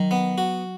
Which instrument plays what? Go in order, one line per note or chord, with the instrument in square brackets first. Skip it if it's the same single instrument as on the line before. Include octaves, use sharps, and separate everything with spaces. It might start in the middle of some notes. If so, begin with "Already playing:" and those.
Already playing: [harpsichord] D#3 [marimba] F#3
[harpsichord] B3
F#4